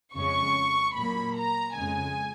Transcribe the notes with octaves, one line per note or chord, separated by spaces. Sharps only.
F2 C#3 G#3 C#4 C#6
A#2 F#3 A#3 B5
A#5
F2 C#3 G#3 G#5